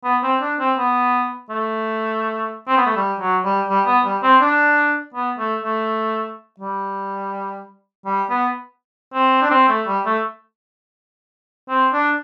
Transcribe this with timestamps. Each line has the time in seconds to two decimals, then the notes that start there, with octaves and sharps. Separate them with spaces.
0.04 B3
0.23 C4
0.41 D4
0.59 C4
0.77 B3
1.50 A3
2.68 C4
2.77 B3
2.86 A3
2.96 G3
3.20 F#3
3.44 G3
3.68 G3
3.86 B3
4.05 G3
4.23 C4
4.41 D4
5.14 B3
5.39 A3
5.62 A3
6.60 G3
8.05 G3
8.30 B3
9.14 C4
9.42 D4
9.51 C4
9.69 A3
9.87 G3
10.05 A3
11.69 C4
11.93 D4